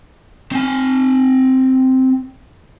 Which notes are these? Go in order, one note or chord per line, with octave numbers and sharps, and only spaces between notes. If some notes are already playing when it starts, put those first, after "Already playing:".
C4 G#5